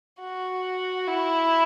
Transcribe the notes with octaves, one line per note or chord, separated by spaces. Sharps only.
F#4
E4